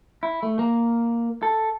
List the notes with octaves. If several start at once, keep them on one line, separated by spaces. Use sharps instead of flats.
E4
A3
A#3
A4